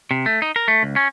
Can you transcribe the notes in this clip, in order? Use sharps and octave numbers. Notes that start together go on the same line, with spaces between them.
C3
A3
D#4
A#4
A3
C#2
C#4